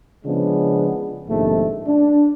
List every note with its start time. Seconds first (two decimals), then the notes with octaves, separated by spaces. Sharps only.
0.24 C#3 F3 G#3 B3 D4
1.28 A#1 G#2 C3 D#3 A3
1.86 D4